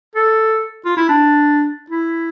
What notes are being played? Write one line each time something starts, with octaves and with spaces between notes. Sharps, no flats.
A4
F4
E4
D4
E4